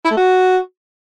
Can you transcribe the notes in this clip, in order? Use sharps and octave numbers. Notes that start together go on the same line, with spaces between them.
E4
A3
F#4